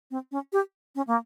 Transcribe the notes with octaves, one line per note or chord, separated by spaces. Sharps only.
C4
C#4
G4
C#4
A#3